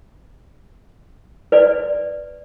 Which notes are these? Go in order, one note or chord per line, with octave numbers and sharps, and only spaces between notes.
B4 D5